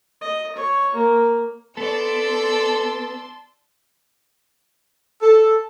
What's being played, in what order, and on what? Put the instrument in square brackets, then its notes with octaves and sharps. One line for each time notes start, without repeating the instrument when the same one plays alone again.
[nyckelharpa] D#5
C#5
A#3
[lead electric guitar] B3 [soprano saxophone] A4 [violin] D5 E6 [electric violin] A5 C6
[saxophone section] A4